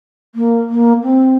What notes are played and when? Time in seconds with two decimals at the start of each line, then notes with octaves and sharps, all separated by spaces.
0.35 A#3
0.69 A#3
1.03 C4